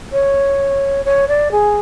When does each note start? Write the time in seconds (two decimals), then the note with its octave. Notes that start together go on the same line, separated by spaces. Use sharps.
0.12 C#5
1.05 C#5
1.28 D5
1.52 G#4